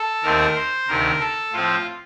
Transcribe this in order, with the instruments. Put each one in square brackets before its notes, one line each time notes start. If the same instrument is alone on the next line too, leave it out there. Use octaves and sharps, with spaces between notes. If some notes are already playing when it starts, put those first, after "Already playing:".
Already playing: [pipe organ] A4
D#2 D#3 A3 C4 A#4
C5
D2 C3 D#3 A#4
A4
A2 F3 C4 F4